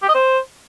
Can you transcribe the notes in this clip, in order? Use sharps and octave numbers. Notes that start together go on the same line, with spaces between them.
G4
D#5
C5